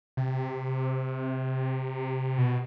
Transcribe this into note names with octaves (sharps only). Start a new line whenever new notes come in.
C3
B2